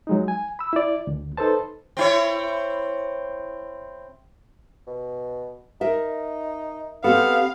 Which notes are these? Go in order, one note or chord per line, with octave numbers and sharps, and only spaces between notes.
F#3 G#3 D#4
G#5
B5 E6
E4 D5
D2
D#4 A4 B4 C5 A5
C4 E4 C#5
B2
D#4 A#4 D#5 E5
B3 C4 G4 A4 F5